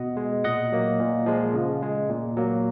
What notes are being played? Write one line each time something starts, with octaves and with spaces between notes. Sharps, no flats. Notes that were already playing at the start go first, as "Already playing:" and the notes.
Already playing: B2 D#5 F#5
G#3
A#2 D#5 F#5
F#3 A#3
A#2
F3 G#3
C#3
G#3
A#2
F#3 A#3